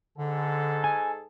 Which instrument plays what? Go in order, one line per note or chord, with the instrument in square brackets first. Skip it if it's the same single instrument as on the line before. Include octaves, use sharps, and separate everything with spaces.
[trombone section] G#2 G#4 A4 [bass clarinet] D3
[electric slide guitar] G#5